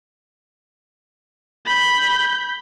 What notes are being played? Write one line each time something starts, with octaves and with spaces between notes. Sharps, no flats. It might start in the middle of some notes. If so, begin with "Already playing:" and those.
B5 G6